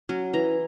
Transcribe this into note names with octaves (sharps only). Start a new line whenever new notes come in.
F#3 C#4
E3 A#5